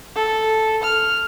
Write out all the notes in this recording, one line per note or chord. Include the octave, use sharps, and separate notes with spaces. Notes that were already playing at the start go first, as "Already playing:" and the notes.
A4
F6